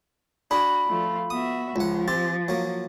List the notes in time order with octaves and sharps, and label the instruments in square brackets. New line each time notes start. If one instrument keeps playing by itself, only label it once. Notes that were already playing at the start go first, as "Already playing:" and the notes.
[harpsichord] D4 G#4 [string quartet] F#4 [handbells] B5
[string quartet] F3 A3 F4
[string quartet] B3 F#4 E5 [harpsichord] D#6
[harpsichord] C#2 F#5 [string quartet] F3
[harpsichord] C4 G4 [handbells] A6
[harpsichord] F#3 A#3